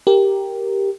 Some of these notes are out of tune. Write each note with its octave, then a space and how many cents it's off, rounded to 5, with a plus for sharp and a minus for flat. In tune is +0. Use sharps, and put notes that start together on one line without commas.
G4 +0 A#4 +0